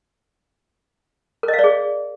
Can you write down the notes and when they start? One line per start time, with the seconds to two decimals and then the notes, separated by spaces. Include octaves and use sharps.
1.43 A#4
1.48 D#5
1.53 F5
1.59 D5
1.64 G#4